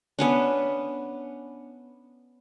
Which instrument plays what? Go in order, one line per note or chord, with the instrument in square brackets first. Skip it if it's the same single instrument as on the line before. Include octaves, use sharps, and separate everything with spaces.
[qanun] B3 C#4 D4